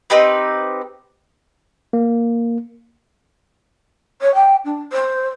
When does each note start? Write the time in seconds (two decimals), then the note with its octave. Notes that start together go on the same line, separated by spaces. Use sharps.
0.10 C4 D#4 G4 B4
1.93 A#3
4.21 C#5
4.34 G5
4.64 D4
4.92 C5